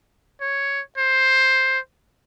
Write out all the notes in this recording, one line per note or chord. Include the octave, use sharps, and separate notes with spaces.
C#5
C5